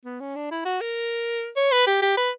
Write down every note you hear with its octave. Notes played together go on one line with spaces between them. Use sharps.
B3
C#4
D4
E4
F#4
A#4
C#5
B4
G4
G4
B4